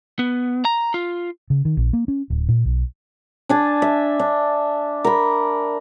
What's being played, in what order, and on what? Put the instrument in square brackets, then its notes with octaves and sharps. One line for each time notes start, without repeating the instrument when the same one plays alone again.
[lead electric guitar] B3
A#5
F4
[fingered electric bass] C#3
D#3
A#1
A#3
C#4
D1
A#2
B1
[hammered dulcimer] D4 G#5 A5
E5
D4
A#4 B5